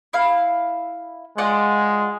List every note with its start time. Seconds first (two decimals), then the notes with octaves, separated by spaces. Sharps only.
0.13 E4 F5
1.38 G#3 F4 D5 F#5